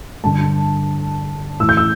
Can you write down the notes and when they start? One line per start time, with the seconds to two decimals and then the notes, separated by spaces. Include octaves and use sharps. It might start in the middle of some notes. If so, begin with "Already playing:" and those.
0.24 G2 D3 A5
1.59 A2 E3 E6
1.69 G6
1.77 E6